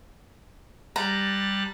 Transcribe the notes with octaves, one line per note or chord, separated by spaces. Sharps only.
G3 A5 A#5 F#6